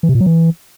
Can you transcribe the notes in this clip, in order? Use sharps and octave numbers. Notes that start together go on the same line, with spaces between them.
E3
C3
A#2
F#3
E3